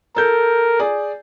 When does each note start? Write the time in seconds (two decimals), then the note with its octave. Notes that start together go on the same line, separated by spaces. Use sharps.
0.16 A4 A#4 G6
0.79 G#4 D5